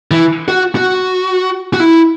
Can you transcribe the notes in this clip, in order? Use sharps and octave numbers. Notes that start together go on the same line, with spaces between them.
E3
F#4
F#4
F#4
E4